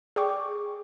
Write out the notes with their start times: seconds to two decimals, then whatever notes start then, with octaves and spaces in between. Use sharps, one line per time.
0.16 G#4 D5 G5 C#6 D6